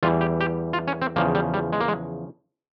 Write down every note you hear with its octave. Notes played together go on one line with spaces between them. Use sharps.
E2 E3 G3 F4
G4
G4
F4
C#4
C4
E2 C#3 F3 A#3
G3
G3
G#3
A#3
G#3